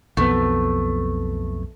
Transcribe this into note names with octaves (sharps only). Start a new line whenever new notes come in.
B1 F2 A3 B3